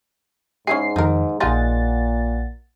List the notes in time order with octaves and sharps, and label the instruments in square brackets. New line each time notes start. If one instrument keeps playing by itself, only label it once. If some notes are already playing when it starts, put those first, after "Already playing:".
[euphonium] G#2 [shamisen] C#4 E4 G#4 [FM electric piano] C7
[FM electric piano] F2 D#3 [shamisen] D#4 A#4
[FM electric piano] A#1 F#5 A6 [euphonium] A#2 [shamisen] D#4 F4 G#4